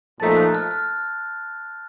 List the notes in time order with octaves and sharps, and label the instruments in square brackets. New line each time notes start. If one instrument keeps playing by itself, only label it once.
[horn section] A#2 F3 A3 D#4 [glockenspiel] A5 A6
[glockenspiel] F#6
F6
F6